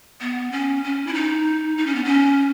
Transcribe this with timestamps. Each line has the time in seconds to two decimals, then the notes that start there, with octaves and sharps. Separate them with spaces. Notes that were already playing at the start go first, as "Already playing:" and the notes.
0.21 B3
0.52 C#4
0.84 C#4
1.07 E4
1.14 D#4
1.78 D#4
1.87 C#4
1.95 B3
2.04 C#4